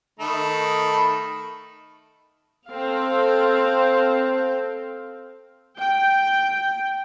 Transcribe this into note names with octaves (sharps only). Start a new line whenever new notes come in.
D#3 A3 B5
C4 A4 F5
G5